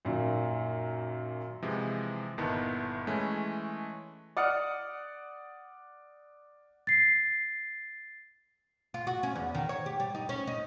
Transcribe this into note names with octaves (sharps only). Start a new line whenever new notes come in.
F#2 A#2 D#3
C3 E3 F3 G#3
G1 A#2 D#3 B3 E4 A5
E3 G#3 A3 C#4
D5 F#5 D#6 F6 C#7
A6 C7
F4
F#4
C#4
E2
D#3
C#5
G4
G3
D#4
C#4
D#4